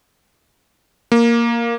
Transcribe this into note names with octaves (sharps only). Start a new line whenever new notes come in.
A#3